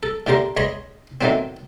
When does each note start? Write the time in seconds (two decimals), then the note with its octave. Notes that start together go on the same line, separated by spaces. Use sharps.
0.03 A4
0.27 A2 D3 G4 A#4 C6
0.57 C#2 C#5 D#5 B5 C6
1.21 A2 D#3 E3 F#3 B3 C4